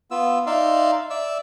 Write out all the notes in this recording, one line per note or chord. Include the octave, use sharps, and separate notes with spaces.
B3 F4 E6
D#4 D5 E5 F5 C6
D5 E5 E6